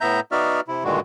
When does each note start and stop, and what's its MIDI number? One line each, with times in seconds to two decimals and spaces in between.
0.01 0.20 45
0.01 0.20 59
0.01 0.20 76
0.01 0.20 82
0.01 0.20 91
0.32 0.60 59
0.32 0.60 63
0.32 0.60 66
0.32 0.60 74
0.32 0.60 76
0.32 0.60 89
0.68 0.84 48
0.68 0.84 64
0.84 1.00 43
0.84 1.00 46
0.84 1.00 50
0.84 1.00 51
0.84 1.00 56
0.84 1.00 66